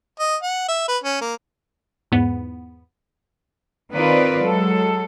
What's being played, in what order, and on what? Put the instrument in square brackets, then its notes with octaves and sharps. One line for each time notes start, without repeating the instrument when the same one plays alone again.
[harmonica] D#5
F#5
E5
B4
C#4
A#3
[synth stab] E2 G#2 B3
[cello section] D#3 C4 F4 A#4 B4 D5
F#3 G#3 A4